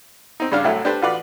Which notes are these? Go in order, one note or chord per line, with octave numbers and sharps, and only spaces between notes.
C4 D#4
G2 C#3 G3 D4 F5
C2 A2 F#3 A3 E4
D4 G4 A4 B4 C5 A5
A1 F4 F#4 B4 D5 B5